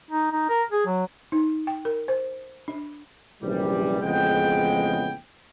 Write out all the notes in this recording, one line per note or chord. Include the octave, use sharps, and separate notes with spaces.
D#4
D#4
A#4
G#4
F#3
D#4
G5
A#4
C5
D4
A#1 F#2 C3 E3 G3
A1 F2 C#3 G#3 B3 G5